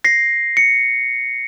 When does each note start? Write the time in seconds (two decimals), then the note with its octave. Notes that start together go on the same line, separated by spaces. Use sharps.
0.04 A#6 C7
0.57 C#7